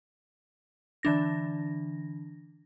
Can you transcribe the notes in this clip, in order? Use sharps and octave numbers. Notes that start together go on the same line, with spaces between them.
D3 E3 D4 A#6